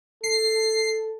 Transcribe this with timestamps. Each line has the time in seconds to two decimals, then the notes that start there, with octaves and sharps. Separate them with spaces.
0.23 A4 C7